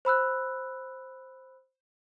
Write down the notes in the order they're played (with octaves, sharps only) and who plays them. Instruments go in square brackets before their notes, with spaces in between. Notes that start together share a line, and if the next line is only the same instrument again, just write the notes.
[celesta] C5 B5 E6 F#6